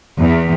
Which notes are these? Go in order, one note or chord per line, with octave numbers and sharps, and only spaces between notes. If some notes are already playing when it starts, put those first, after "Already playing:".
E2